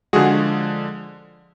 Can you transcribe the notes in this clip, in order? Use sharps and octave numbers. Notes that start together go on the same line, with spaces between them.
D3 F3 G#3 F#4 G#4